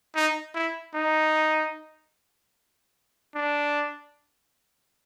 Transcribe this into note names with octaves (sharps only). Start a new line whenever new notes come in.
D#4
E4
D#4
D4